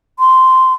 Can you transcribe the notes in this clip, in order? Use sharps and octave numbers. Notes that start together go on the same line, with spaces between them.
C6